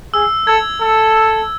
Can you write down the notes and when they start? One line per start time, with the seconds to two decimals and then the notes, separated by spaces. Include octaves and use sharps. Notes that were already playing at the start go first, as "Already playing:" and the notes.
0.14 G#4 E6
0.47 A4 G#6
0.81 A4